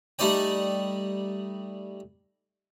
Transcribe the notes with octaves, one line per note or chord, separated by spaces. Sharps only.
G3 A3 D#4 D5 G5